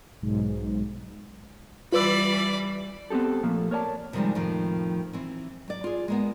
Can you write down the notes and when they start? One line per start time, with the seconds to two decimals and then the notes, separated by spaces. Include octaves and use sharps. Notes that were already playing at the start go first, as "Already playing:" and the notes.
0.22 B1 G#2
1.92 E3 G3 F4 B4 D5 B5 E6
3.10 B3 C4 D#4 G4 A4
3.43 A#2 F3 A3 A#3
3.71 A#4 C#5 D5 G#5 A5
4.13 C3 D#3 F3 G3 G#3
4.35 F2 A2 D#3 F3
5.13 E3 C4
5.68 F#3 D5
5.84 F4 G#4
6.08 G#3 A#3 B3